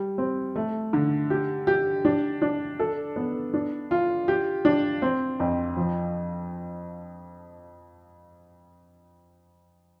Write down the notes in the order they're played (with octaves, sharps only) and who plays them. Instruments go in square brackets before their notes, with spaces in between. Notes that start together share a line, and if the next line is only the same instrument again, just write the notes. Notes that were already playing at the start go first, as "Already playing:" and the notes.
Already playing: [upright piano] G3
C4
A3
D3
G4
G4
D4
D4
A4
B3
D4
F4
G4
D4
C4
F2
F3